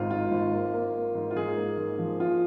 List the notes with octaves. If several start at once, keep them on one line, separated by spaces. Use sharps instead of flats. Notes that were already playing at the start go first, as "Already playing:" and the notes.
Already playing: G#1 G#2 F4
G#2 F4
G#1
A#3
A#3
A#3
G#2
F4
G#2 G#4
A#3
G#2
F3
F3 F4